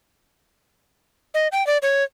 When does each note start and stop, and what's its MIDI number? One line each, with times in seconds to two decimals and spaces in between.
1.34 1.48 75
1.52 1.65 79
1.67 1.78 74
1.82 2.03 73